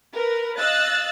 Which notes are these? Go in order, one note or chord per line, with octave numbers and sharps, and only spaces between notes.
A#4 B4
D#5 F5 E6 F#6 A6